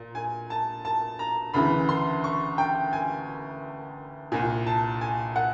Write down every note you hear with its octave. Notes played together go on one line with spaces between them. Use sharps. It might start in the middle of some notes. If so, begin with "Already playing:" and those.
Already playing: A#2
G#5
A5
A5
A#5
D2 C#3 E3 B5
C6
C#6
G5
G#5
C2 A#2 G#5
A5
G#5
F#5